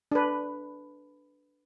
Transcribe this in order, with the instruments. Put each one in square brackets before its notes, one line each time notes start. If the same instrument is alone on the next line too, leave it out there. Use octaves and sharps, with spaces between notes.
[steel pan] D4 B4